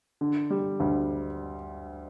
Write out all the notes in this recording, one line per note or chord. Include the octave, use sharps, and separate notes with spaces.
D3
G3
D2